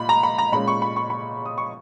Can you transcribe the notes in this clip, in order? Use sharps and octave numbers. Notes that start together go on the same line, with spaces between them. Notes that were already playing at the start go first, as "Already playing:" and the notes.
Already playing: A#2 B5
A#5
B5
A#5
A#2 G#3 C#4 B5
C#6
B5
C#6
B5
D#6
C#6